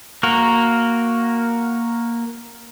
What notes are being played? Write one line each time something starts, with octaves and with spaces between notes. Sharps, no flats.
A#3 F#4 A#4